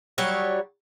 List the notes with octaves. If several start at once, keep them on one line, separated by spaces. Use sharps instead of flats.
F#3 G3 C#5